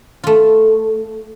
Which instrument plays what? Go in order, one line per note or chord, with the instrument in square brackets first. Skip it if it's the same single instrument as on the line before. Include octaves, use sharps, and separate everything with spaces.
[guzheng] A3 F4